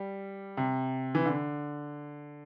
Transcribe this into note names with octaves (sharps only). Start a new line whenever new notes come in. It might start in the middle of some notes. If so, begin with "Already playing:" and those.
Already playing: G3
C3
E3
D3